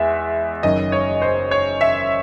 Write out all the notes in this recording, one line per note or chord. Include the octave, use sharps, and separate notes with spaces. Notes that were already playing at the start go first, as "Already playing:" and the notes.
Already playing: E2 G#3 E5
F#1 F#2 D#3 D#5
C#5
C5
C#5
E5